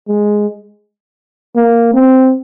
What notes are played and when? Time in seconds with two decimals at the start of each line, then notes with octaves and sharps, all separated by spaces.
0.08 G#3
1.56 A#3
1.93 C4